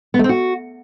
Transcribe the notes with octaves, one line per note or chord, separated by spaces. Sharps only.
B3
A3
C4
F#4